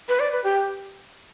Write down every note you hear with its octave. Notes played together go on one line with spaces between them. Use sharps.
B4
D5
B4
G4